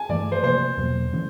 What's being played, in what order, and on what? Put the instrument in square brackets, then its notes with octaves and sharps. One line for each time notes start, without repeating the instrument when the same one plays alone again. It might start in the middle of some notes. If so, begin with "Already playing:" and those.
Already playing: [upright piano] G#5 A5
[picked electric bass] G2 E3 A3 [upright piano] D5
[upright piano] C5
[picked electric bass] C3 F3 A#3 [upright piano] C5
[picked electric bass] E2 B2 F#3 A#3
C#3 E3 A3